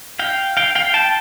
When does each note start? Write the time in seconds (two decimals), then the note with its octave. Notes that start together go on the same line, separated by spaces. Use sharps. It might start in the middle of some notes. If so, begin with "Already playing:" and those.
0.19 F5 G5
0.57 F5 G5
0.75 F5 G5
0.94 G5 A5